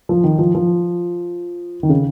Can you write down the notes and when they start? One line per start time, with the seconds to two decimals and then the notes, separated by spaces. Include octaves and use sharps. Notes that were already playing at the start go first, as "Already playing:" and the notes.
0.09 F3
0.24 D#3
0.38 F3
0.55 F3
1.83 D#3
1.89 C#3